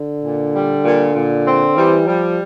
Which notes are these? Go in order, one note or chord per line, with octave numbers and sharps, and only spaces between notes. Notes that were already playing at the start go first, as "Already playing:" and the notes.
Already playing: D3
A#2
G3
A#2
A#2
C4
E3 G3
F3 G3